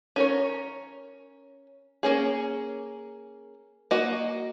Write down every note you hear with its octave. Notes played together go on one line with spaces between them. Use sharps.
C#4 A#4 C#5
A#3 C#4 G#4
A#3 F#4 D#5